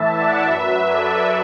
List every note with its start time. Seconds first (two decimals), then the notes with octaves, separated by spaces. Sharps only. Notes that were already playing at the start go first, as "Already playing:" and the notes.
Already playing: A2 E3 E5 A5
0.16 D5 F#5
0.44 F#2 F#3 B4 E5
0.87 A4 D5